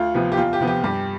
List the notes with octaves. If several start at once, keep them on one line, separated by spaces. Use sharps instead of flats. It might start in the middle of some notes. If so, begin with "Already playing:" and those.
Already playing: D2 F4
C3 F3 B3
G4
E2 F4
G4
C3 F3 B3
G4
G2 G4